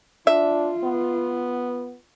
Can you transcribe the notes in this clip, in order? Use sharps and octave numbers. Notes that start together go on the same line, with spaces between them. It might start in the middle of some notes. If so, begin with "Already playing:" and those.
D4 F4 E5
B3